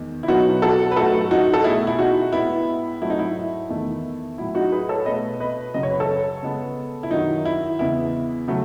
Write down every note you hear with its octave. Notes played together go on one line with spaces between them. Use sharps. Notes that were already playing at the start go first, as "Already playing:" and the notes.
Already playing: E2 D#3 G#3
E4
B2 F#3 B3 D#4 F#4
F#4 A4
B4
G#2 F#3 A3 F#4 A4
D#4 F#4
A4
B2 A3 E4 G#4
E4
D#4 F#4
A2 G#3 B3 E4
G#2 F#3 A3 E4
D#4
E4
E2 D#3 A3
A2 F#3 A3 E4
D#4 F#4
G#4 B4
A4 C#5
B2 A3 B4 D#5
B4 D#5
F#2 C#3 F#3 D#5
C#5
B4
A4 C#5
C#3 G#3 B3
E4
F#2 D#3 F#3 D#4
E4
E2 C#3 G#3 B3 E4
C#3 F#3 A3